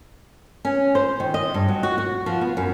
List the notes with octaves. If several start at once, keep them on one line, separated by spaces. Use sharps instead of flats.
C#4
C5
D#3
D#5
G2
F#3
F#4
F#4
F3
B3
F#2